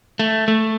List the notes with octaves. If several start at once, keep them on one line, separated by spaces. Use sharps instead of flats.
A3
A3